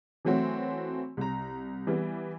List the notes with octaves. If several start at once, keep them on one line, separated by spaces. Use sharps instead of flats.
E3 F#3 A3 C4 F#4
C2 A#5
E3 G3 B3